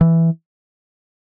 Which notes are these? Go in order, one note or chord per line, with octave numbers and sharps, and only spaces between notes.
E3